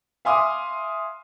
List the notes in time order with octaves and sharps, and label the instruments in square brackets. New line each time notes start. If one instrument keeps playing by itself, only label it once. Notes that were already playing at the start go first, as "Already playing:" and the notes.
[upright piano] E5 F5 G#5 C6 D6 D#6